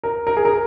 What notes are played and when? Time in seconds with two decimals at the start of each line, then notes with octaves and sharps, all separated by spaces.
0.03 A#4
0.27 A#4
0.37 G#4
0.45 A#4